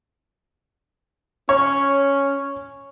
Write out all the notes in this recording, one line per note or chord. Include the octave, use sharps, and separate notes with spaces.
C#4 C#5